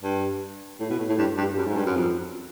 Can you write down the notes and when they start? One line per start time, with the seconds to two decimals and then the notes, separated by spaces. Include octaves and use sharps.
0.03 G2
0.80 A2
0.90 B2
0.99 A2
1.09 A2
1.18 G2
1.38 G2
1.57 F#2
1.67 G#2
1.77 G2
1.86 F#2
1.96 F2